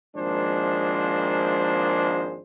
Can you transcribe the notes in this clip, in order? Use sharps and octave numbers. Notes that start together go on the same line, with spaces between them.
G#1 F3 G#3 A#3 D4 C5